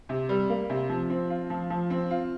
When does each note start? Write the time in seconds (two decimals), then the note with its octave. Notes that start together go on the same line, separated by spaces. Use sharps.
0.09 C3
0.29 G3
0.49 A#3
0.70 C3
0.89 F3
1.10 C4
1.30 F4
1.50 F3
1.70 F3
1.90 C4
2.11 F4